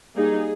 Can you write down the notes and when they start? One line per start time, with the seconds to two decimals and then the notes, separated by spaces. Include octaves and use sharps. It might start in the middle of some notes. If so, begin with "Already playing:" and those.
0.15 G3 A#3 D#4 G#4